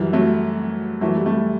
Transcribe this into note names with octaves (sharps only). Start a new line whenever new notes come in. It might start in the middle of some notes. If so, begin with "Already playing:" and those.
Already playing: F#2 E3 G3
F#3 A3
F#2 E3 F#3 A3
G3
A3
G3